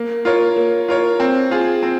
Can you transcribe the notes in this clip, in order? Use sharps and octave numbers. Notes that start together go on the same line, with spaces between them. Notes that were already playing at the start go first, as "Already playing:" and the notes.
Already playing: A#3
F4 A#4 C#5
A#3
F4 A#4 C#5
C4
F4 G#4
C4